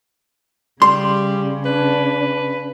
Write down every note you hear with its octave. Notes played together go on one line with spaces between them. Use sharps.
C#3 G3 C6
D4 B4